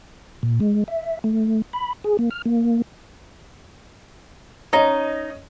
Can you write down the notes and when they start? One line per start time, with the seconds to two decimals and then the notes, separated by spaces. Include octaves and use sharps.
0.43 A#2
0.60 G#3
0.88 E5
1.24 A3
1.73 B5
2.04 G#4
2.19 A#3
2.31 F6
2.46 A#3
4.73 C#4 D#4 D#5